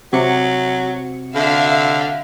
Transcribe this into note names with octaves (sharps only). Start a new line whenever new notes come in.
C3 F#3 F#4 C#7
D3 E5 F5